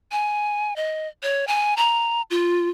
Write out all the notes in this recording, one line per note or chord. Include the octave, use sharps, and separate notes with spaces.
G#5
D#5
C#5
G#5
A#5
F4